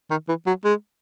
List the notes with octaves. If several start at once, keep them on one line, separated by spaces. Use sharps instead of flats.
D#3
E3
F#3
G#3